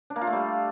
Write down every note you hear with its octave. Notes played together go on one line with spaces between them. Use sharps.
D4
A#3
F4
A3
G3